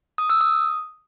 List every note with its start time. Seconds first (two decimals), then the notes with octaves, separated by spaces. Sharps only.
0.18 D#6
0.30 E6
0.41 D#6